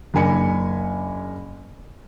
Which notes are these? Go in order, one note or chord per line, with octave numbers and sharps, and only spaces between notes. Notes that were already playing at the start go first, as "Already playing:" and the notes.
F#1 D4 A#4 G#5 B5 C#7